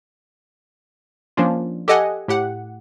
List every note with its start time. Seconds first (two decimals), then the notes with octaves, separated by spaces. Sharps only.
1.37 F3 A#3 C#4 D4 F4
1.88 G4 A4 D#5 F#5 G#5
2.28 A2 G4 F#5